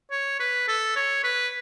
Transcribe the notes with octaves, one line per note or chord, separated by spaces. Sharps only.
C#5
B4
A4
C#5
B4